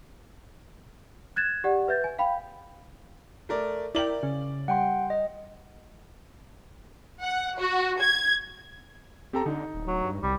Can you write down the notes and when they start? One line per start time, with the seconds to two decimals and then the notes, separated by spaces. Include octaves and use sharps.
1.36 F#6 G#6 A6 E7
1.64 G4 D5 F#5
1.88 B4 E5 G6 A6
2.04 G#5
2.19 F5 G5 B5
3.49 A3 A#4 D5
3.95 E4 A#4 D5 G5 F#7
4.23 C#3
4.68 G3 F#5 G5 C6
5.10 D#5
7.21 F#5
7.58 F#4
8.00 G#6
9.33 C4 G4 A4 A#5
9.46 D3 D#4
9.74 D1
9.87 F#3
10.04 G2
10.23 C2 G3